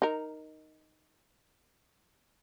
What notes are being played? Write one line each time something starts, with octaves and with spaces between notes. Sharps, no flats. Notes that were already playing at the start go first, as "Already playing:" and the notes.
D#4 A#4